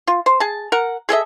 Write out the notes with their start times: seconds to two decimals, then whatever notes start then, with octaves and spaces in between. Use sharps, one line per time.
0.07 F4
0.26 C5
0.40 G#4 A5
0.72 A#4 F#5
1.09 G#4 A4 D#5 E5